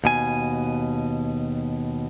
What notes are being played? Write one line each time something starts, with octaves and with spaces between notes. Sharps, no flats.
D#2 B2 G#5